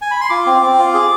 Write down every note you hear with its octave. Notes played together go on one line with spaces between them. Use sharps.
G#5
B5
C6
F4 D6
C4
C4
F4
G#4